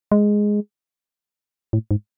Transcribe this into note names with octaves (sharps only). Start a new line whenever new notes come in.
G#3
A2
G#2